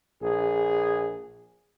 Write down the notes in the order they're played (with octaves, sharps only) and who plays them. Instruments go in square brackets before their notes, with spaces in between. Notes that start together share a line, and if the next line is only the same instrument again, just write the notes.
[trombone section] A#1 G#4